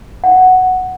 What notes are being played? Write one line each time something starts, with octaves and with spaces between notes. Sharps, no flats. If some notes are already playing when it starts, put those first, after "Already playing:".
F#5